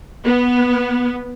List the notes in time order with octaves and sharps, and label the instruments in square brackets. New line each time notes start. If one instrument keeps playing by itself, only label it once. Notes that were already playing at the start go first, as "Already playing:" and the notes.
[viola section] B3